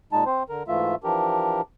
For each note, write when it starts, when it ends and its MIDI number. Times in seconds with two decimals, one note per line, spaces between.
0.13 0.24 46
0.13 0.24 56
0.13 0.24 63
0.13 0.24 81
0.26 0.43 60
0.26 0.43 72
0.49 0.63 50
0.49 0.63 70
0.68 0.95 44
0.68 0.95 52
0.68 0.95 57
0.68 0.95 65
0.68 0.95 76
1.04 1.61 52
1.04 1.61 53
1.04 1.61 62
1.04 1.61 67
1.04 1.61 70